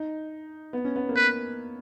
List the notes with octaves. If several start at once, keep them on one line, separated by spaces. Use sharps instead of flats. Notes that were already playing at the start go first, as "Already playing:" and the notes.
Already playing: D#4
B3
C#4
B3
A#3
B3 B4